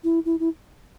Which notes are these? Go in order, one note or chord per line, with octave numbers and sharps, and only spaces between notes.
E4
E4
E4